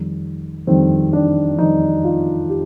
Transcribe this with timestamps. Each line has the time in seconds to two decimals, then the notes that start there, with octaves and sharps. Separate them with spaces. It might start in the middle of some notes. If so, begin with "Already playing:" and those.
Already playing: F2 D#3 G3
0.67 F2 D#3 G3 C4
1.13 D4
1.58 F2 D#3 G3 D#4
2.04 F4
2.50 G4